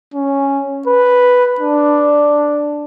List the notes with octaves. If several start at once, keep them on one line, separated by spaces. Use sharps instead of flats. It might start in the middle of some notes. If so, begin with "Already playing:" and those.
C#4
B4
D4